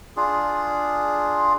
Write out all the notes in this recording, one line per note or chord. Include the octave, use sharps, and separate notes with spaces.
D4 F4 G#4